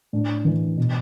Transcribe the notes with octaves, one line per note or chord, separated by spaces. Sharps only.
A2 D4
E3
B2